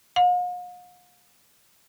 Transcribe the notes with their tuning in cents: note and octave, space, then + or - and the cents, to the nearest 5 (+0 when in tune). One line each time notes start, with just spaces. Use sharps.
F5 +45